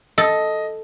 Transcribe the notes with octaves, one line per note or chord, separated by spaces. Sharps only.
A4 D#5